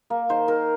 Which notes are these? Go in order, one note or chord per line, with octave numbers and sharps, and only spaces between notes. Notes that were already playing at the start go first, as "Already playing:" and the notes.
A#3
D#3 C5
D#3 A#4